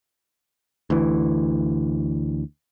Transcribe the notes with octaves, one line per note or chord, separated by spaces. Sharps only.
D2 E3